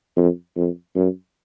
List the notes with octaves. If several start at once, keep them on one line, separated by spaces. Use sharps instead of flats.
F2
F2
F#2